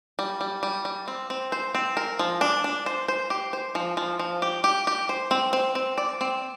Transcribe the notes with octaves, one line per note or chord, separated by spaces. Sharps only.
G3
G3
G3
G3
C4
C4
C5
C4
A#4
F3
D4
D4
C5
C5
G4
C5
F3
F3
F3
G4
G4
G4
C5
C4
C4
C4
D5
C4